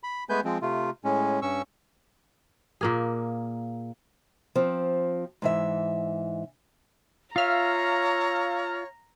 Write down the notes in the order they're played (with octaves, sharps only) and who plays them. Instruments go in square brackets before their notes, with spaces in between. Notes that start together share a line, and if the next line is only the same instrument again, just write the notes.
[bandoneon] B5
G#3 A3 B3 B4 G#5 G6
F3 G#3 C4
C3 A3 F4
A2 G#3 C#4
G2 C#4 C#6 E6
[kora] A#2 A#3 G#4
[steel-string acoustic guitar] F3 C4
G#2 E3 E5
[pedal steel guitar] F4 E5 [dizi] C#5 [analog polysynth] F5 F6 [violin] A#5